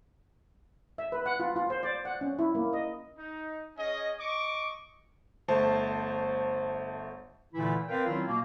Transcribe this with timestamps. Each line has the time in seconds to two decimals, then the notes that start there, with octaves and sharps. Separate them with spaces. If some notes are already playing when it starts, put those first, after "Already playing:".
0.98 E5
1.12 B4
1.26 F#5
1.40 F4
1.56 F4
1.70 C5
1.83 D5
2.05 F#5
2.21 C#4
2.39 E4
2.55 A#3
2.73 D#5
3.17 D#4
3.77 C#4 G#4 D#5
4.18 D#5 C#6 D6
5.48 G1 A3 C5 A5
7.54 A#2 D3 E3 A3 E4
7.88 C4 A#4 B4 D5 F5 G5
8.06 D#3 F#3 C4 C#4 E4 F4
8.27 B2 A#3